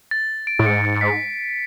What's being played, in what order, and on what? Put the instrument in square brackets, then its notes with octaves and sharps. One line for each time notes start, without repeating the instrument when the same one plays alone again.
[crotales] A6
D7
[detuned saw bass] A2
[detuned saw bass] G#2 [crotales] C#7
[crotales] B6